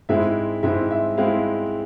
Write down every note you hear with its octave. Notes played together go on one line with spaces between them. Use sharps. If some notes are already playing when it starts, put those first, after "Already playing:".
G#2 G#3 C4 E4 E5
G#2 G#3 C4 E4 E5
E5
G#3 C4 E4 F5